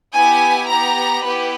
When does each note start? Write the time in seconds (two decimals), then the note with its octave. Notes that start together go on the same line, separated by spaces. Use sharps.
0.14 B3 E4 G4 G#5
0.69 B3 G4 A#5
1.24 B3 E4 G4 B4